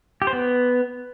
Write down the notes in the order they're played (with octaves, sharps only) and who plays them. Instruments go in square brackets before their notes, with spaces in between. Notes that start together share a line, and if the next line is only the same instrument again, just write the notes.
[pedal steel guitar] G4
C5
B3